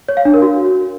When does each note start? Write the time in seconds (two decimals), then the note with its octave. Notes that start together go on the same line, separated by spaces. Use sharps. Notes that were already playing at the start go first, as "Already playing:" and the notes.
0.09 C#5
0.17 F5
0.25 D4
0.34 A#4
0.42 F#4